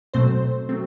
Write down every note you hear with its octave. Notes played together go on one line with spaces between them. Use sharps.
B2 F#3 A3 C4 C5
F#3 A3 C4